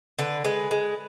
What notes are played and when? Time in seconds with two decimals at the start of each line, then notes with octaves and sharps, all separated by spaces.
0.19 D3 B4
0.44 G#3 B4
0.71 G#3